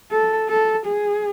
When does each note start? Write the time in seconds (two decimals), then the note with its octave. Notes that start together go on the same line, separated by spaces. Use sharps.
0.11 A4
0.49 A4
0.86 G#4